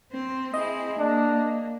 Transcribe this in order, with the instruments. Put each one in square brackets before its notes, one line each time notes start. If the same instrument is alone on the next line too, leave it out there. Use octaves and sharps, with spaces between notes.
[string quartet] C4
[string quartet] C4 E4 G#4 [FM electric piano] D#5
[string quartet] A#3 [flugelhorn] D4